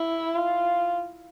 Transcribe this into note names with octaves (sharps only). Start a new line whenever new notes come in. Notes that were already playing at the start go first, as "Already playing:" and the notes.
Already playing: E4
F4